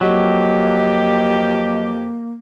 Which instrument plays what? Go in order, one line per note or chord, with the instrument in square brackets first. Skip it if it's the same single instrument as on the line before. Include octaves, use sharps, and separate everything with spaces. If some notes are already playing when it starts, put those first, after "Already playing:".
[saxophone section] F2 G4 [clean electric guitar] F#3 [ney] A#3 [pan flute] D#5